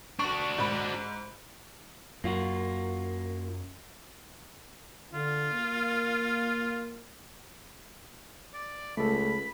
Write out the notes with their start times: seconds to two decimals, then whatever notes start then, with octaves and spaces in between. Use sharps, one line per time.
0.19 D4 F#4 C#6
0.58 G#2 B5
2.24 F#2 A#3 F4 F#4
5.13 D3 F4
5.54 A#3
8.54 D5
8.97 C#2 A3 A4 B5